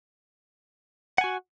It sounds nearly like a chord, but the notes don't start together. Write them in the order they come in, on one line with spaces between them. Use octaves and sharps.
F#5 G#5 F#4